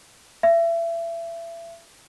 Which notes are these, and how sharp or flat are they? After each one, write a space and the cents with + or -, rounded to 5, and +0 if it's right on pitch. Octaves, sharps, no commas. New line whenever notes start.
E5 +30